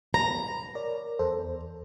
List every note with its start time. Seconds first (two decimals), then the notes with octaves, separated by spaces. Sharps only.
0.14 A#5 B5
0.75 A#4 C#5 D5
1.19 E2 A4 C5
1.39 E2